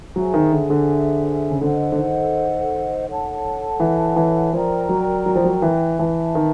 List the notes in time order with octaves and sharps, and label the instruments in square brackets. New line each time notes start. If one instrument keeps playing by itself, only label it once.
[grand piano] F#3 [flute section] G#4 C5 E5 G#5
[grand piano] D#3
D3
D3
C#3
[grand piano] D3 [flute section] A4 C5 D#5 F#5
[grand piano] D3
D#3
[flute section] A4 C#5 F#5 A5
[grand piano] E3
E3
[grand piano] F3 [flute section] A#4 D5 G5 A#5
[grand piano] F#3
F#3
F3
F#3
E3
[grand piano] E3 [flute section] B4 E5 A5
[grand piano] D#3